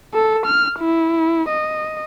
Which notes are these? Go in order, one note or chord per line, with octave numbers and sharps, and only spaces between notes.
A4
F6
E4
D#5